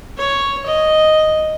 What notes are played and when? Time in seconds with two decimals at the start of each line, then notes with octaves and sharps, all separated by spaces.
0.18 C#5
0.66 D#5